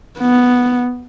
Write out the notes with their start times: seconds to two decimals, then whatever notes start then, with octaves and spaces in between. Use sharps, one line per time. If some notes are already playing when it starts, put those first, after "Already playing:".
0.19 B3